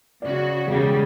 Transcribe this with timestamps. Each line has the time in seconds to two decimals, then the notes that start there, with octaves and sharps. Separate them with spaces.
0.22 C#3 F#4 D5
0.67 E1 C#3 G3 G#3